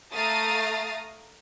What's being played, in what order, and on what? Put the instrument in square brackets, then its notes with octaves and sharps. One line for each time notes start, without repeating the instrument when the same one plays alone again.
[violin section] A3 F5 A#5 D#6 A6